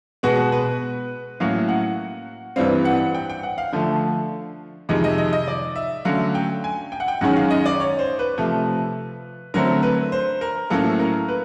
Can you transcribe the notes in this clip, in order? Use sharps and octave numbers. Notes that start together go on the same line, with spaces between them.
B2 G#3 B3 F#4
B4
A2 F#3 A#3 C#4 F5
F#5
G2 E3 G3 C4 F5
F#5
G5
G5
F#5
F5
D3 F3 A3
F2 C3 D#3 G#3 D#5
D#5
D#5
D#5
D5
E5
D3 F#3 A3 C#4 F5
G5
G#5
G5
F#5
G5
F#2 D#3 G#3 C#4 F#5
F5
D#5
D5
C#5
C5
B4
C3 F3 A3
D3 F#3 A3 C4 A#4
B4
C5
A#4
A2 F#3 A#3 C#4 A4
A#4
B4